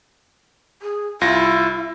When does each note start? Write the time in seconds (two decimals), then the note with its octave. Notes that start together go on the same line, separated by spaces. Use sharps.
0.82 G#4
1.21 C2 E4 F4 A#6